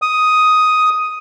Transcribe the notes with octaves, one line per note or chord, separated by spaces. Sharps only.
D#6